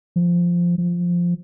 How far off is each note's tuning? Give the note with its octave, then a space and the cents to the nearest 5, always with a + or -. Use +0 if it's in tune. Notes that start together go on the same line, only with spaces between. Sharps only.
F3 -5
F3 +0